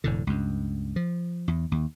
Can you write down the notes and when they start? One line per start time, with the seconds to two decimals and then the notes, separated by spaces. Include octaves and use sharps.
0.04 E1 A2 D3
0.27 C#2 G2
0.96 F3
1.48 E2
1.72 D#2